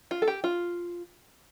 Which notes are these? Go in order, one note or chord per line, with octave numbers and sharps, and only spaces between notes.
F4
A4
G4
F4